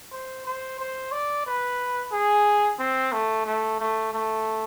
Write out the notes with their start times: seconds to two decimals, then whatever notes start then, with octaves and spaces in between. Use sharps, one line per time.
0.12 C5
0.46 C5
0.80 C5
1.12 D5
1.47 B4
2.12 G#4
2.79 C4
3.12 A3
3.46 A3
3.80 A3
4.13 A3